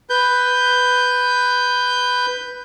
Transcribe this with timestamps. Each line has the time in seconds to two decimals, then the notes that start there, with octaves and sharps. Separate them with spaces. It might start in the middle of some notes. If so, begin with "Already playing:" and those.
0.10 B4 G6